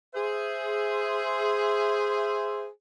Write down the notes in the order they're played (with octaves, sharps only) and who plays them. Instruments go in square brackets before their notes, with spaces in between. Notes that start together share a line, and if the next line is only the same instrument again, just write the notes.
[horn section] G#4 C5 E5